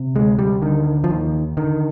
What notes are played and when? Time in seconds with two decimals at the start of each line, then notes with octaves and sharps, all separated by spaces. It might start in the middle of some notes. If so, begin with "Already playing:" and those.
Already playing: C3
0.15 D2 G#3
0.39 G3
0.62 D3 D#3
1.04 F3
1.09 D#2 D#3
1.57 D3 D#3